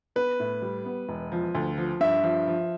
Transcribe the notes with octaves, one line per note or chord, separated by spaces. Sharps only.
B3 B4
A2
G3
B3
E1
F3
D2
F3
G2 E5
F3
F3